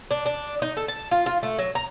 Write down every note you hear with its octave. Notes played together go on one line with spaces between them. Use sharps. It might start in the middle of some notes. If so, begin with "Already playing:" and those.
D4
D4
D#4
A4
A5
F4
F4
A3
F#3
A#5